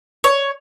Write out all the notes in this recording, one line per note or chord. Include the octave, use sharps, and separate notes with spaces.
C#5